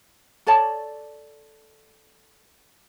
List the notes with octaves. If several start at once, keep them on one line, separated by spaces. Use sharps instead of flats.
A4 C#5 D5 A5